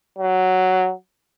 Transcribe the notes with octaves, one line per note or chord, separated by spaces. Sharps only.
F#3